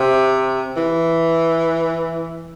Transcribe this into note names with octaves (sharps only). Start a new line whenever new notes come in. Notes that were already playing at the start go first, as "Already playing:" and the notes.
Already playing: C3
E3